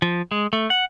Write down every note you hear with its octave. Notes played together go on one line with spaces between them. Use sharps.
F3
G#3
A3
F#5